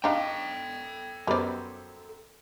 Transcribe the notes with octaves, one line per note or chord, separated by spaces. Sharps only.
D4 D#4 A4 D#5 F5 G5 A#5
F#2 G3 B3 C5 D5